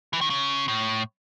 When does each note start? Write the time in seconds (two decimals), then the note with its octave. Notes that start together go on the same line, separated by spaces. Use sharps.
0.13 E3
0.21 D#3
0.30 C#3
0.68 A2